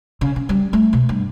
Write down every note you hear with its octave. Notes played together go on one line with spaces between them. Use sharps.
C#3
C#3
G3
A3
B2
G2